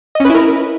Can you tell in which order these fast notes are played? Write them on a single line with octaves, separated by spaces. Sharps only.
D#5 C#4 B4 E4 A#4